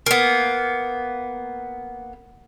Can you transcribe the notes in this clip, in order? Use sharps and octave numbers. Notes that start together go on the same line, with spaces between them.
A#3 B3